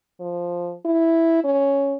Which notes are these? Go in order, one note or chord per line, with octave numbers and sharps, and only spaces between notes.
F3
E4
C#4